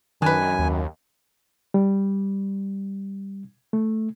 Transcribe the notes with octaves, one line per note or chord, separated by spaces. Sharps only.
F#2 D#3 D4 B4 G#5
D#2
G3
A3